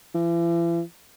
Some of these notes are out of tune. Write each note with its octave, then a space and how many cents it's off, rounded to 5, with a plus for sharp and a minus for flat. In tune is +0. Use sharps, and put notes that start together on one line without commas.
E3 +40